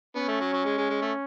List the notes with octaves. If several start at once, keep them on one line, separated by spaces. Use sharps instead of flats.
B3 C#4
A3
F#3
F#3
G#3
G#3
G#3
A3